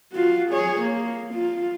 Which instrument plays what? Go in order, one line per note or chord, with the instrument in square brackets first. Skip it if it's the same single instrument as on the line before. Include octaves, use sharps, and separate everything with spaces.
[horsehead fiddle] F4 F#4
G#4 C#5
A#3
F4